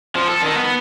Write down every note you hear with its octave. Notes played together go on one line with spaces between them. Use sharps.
F3
A4
D#3
B3